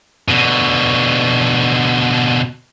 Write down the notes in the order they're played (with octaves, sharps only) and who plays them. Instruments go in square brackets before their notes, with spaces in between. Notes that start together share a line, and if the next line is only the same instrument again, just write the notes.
[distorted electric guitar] B2 D3